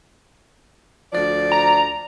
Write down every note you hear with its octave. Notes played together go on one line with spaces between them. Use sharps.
D2 F3 D5
A#5